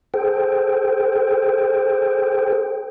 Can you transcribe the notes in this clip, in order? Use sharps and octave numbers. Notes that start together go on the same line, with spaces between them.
G#4 A4 C5 G5